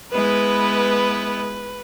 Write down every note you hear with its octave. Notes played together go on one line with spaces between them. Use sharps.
G#3 B3 E4 B4